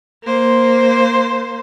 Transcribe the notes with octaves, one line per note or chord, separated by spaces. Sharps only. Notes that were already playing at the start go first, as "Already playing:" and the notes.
A#3 C5